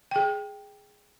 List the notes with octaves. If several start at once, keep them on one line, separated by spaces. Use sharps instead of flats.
G#4 G5